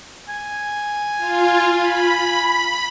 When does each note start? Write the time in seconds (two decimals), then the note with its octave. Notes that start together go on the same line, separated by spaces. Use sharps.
0.29 G#5
1.17 F4
1.77 B5